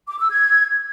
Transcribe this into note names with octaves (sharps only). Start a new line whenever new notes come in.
D6
E6
G#6